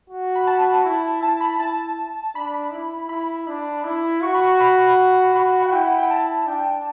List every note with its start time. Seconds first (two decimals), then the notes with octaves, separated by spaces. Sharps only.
0.10 F#4
0.35 B5
0.47 A5
0.85 E4
1.23 E4 A5
1.41 B5
1.59 E4 A5
2.35 D4 B5
2.72 E4
3.09 E4 B5
3.47 D4
3.84 E4
4.23 F#4 C#6
4.35 B5
4.47 C#6
4.60 B5
5.35 F#4 B5
5.62 F#5
5.72 E4 G5
5.99 G5
6.10 A5
6.47 D4 G5